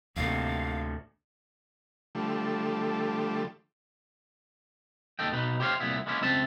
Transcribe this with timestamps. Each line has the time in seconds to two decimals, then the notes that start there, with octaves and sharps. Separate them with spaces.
0.16 D2 A2 C3 D#3 A#3 F5
2.15 D3 F3 G3 A3
5.19 D#2 A4 D#5 G5
5.32 B2 D#4 B4
5.60 G4 C5 C#5 E5 F5
5.80 C2 F2 A#2 B3 E4
6.06 G#3 A#3 B3 C#4 E4
6.21 C#2 C4 E5 A5